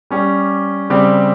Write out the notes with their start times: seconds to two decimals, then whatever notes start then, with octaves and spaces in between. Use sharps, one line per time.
0.10 G3 C#4 G4
0.90 C#3 G3 C4 G4